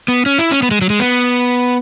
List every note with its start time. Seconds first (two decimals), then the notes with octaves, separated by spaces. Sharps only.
0.08 B3
0.26 C#4
0.38 E4
0.51 C#4
0.63 B3
0.71 G#3
0.81 F#3
0.90 G#3
1.00 B3